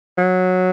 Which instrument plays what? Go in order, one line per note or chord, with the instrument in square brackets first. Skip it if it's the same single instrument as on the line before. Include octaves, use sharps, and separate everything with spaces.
[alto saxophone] F#3